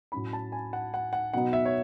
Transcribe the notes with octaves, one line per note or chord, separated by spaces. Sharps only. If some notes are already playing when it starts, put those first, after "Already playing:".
A2 F#3 C#4 B5
A5
G#5
F#5
F#5
F#5
B2 F#3 B3 D#4 F#5
E5
C#5